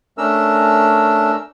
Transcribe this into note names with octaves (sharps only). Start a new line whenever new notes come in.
A3 C#4 D4 A#4 E6